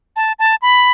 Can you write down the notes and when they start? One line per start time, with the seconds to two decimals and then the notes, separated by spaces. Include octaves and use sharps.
0.16 A5
0.39 A5
0.62 B5